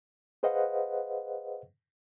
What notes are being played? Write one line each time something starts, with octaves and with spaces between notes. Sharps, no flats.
G#4 B4 C5 D#5 F5 F#5